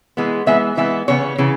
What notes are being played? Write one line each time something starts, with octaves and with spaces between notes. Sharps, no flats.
E3 G#3 B3
E3 G#3 B3 E5
E3 G#3 B3 E5
C#3 E3 B3 C#5
C#3 E3 B3